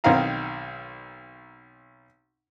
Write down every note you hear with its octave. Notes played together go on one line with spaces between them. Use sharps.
B1 D#3 C4 F5 A#5